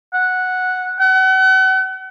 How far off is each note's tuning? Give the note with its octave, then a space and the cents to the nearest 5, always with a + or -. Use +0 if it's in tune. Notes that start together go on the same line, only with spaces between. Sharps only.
F#5 -5
F#5 +35